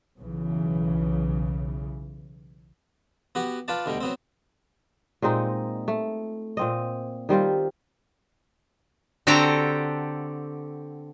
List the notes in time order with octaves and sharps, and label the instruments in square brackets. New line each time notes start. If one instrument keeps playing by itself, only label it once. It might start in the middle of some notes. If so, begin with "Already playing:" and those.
[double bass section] B1 C#3 E3
[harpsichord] B3 F#4 G4
F4 B4 D5 A5
D2 B2 G3 G5
F#3 B3 C4
[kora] A#2 G#3 C4 D#4
A3
A#2 C4 D#5
D#3 G3 C4 F4
[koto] D3 C4 F#4 G4 A4 A#5